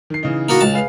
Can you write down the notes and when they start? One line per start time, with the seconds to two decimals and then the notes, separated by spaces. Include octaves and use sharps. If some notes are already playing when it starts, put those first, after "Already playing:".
0.10 D#3 C7
0.23 C#3 E3 D#4
0.49 A#3 B3 F#4
0.61 C#2 A5
0.73 G#4 B4 F5